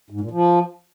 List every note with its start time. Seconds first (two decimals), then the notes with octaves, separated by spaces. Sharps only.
0.10 G#2
0.21 A#2
0.31 F3